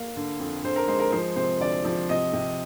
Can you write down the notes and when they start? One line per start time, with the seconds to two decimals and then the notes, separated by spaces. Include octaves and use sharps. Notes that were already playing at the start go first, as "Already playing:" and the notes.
Already playing: A#3 F5
0.16 D3
0.40 F2
0.64 D3 C5
0.76 A#4
0.88 G#3 C5
1.00 A#4
1.12 F3 C5
1.36 C3 C5
1.60 D2 D5
1.85 F3
2.09 C3 D#5
2.33 C3